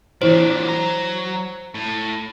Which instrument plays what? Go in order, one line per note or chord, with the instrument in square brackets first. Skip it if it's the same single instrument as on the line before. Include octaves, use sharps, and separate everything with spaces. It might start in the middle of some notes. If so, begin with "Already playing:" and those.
[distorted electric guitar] A#2 D3 [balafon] E3 E4 C#5 [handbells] C5
[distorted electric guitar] F#3 A#5
A2